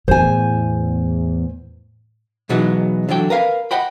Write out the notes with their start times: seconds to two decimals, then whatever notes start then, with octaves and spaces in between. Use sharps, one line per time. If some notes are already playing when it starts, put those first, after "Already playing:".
0.08 E2 A2 C5 G#5
2.49 B2 E3 F#3 G#3 B3 D#4
3.09 D3 E3 F#3 G5
3.30 A#4 B4 F5
3.71 D#5 F#5 G5 B5